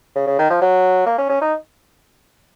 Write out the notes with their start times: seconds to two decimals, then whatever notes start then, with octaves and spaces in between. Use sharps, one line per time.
0.16 C#3
0.27 C#3
0.39 D#3
0.50 F3
0.62 F#3
1.06 A#3
1.18 C#4
1.29 C#4
1.41 D#4